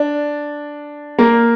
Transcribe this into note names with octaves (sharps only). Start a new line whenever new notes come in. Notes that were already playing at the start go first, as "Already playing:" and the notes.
Already playing: D4
A#3